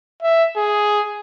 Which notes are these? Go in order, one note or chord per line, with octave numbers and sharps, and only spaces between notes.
E5
G#4